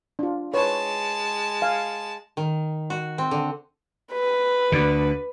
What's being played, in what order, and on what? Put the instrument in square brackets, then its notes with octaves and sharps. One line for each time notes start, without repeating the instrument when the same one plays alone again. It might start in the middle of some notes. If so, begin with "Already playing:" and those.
[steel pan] D4 F4
[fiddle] G#3 A5 [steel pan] B4 C#5
[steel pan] F5 G#5
[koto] D#3
F#4
C4
D3
[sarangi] B4
[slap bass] D2 D3